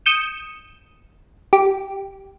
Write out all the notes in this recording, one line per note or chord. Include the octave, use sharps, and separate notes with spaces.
D#6 G6 C#7 E7
G4